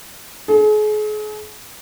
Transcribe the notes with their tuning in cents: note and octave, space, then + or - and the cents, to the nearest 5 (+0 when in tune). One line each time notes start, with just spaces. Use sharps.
G#4 +40